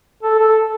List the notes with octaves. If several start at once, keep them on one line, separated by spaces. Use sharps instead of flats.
A4
A4